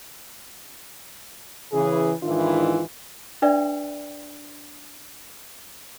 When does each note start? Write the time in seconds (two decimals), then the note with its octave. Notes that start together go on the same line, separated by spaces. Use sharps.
1.73 C#3 E3 G#4
2.23 G#2 D#3 E3 D4 E4 F4
3.42 D4 B4 D5 E5 G5